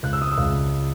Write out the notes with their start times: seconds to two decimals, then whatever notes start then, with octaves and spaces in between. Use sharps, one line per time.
0.03 C#2 F#6
0.13 E6
0.22 D#6
0.31 E6
0.38 C#2